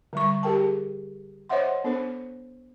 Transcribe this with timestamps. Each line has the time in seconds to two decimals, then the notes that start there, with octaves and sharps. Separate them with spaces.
0.13 D3 G3 C#6
0.43 G4 G#4 A#4 G5 A5
1.49 C5 C#5 D#5 E5 F#5 C6
1.84 B3 D4 A4 C5